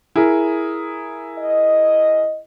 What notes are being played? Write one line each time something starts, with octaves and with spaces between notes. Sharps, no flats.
E4 G#4 A#4
D#5